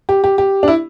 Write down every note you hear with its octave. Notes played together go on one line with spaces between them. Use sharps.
G4
G4
G4
D4
E4